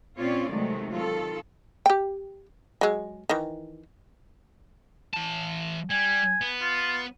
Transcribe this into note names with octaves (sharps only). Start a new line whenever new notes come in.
A#2 C4 C#4 F4 C#5 D5
C3 D#3 F#3 G#3 A3
D#3 F4 A4
G4 G5
F#3 G#3
D#3 E3
E3 A5
G3 G#5
B3
F4